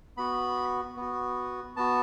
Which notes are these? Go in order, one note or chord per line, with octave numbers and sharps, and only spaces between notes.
B3 F#4 B5
B3 F#4
B3 F#4 A5